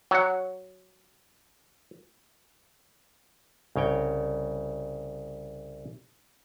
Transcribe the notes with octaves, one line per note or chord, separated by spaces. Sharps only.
F#3 F#5
C2 C#3 C#5 G5